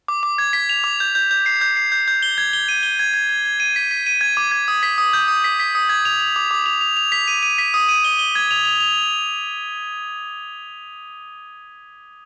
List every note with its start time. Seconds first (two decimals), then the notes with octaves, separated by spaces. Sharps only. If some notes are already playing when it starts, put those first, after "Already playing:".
0.08 D6
0.23 D6
0.38 G#6
0.53 B6
0.69 F7
0.84 D6
1.00 G6
1.15 G6
1.31 G6
1.46 C7
1.61 G6
1.76 C7
1.92 G6
2.08 G6
2.23 G7
2.38 G#6
2.53 G7
2.69 D#7
2.83 G7
2.99 G#6
3.14 G#6
3.29 G#6
3.45 G#6
3.60 D#7
3.76 B6
3.91 B6
4.07 D#7
4.21 G#6
4.37 D6
4.52 G#6
4.68 D#6
4.83 B6
4.98 D#6
5.13 G6
5.28 D#6
5.44 B6
5.60 B6
5.75 D#6
5.89 G#6
6.05 F7
6.20 F7
6.36 D6
6.51 D6
6.66 F7
6.81 F7
6.97 F7
7.12 B6
7.28 D#7
7.43 D#7
7.58 B6
7.74 D#6
7.89 D#7
8.04 G7
8.19 G7
8.35 G#6
8.51 F7
8.65 F7
8.80 F7